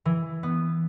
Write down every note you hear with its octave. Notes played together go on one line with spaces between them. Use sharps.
E3
B3